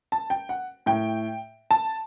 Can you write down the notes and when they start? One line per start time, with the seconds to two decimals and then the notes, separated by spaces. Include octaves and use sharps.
0.12 A5
0.30 G5
0.49 F#5
0.86 A2 G5
1.71 A5